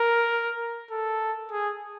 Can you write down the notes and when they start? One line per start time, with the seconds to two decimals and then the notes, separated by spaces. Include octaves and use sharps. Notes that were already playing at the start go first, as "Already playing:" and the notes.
Already playing: A#4
0.91 A4
1.52 G#4